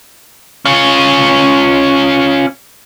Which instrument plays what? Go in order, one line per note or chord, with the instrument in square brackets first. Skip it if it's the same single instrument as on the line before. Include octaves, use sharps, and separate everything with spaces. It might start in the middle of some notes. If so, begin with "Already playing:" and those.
[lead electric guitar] C#4 F4